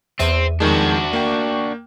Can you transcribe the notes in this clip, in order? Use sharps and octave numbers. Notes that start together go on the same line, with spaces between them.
E2 C4 E5 D#7
F2 D#3 G#3 D4 F#4
A#3 G5